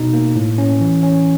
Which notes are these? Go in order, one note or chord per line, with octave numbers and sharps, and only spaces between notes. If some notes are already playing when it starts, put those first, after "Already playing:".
Already playing: B2 D#4
A#3
A2
C#4
E3
C#4